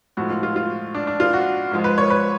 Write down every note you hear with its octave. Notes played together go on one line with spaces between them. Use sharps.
A2 F3 G#3 F#4
F4
F4
F4
D4
D4
F4
F#4
G#2 F3 G#3
B4
C#5
B4